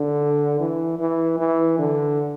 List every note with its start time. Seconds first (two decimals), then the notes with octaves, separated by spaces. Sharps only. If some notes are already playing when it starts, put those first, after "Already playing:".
Already playing: D3
0.60 E3
0.99 E3
1.39 E3
1.79 D3